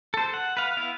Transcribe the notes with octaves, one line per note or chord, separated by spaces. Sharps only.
A4 C5
F#5
B4 F5
B3 E4 F5